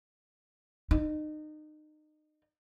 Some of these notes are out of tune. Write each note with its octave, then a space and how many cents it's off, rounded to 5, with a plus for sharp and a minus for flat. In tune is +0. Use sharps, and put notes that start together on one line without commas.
D#4 -30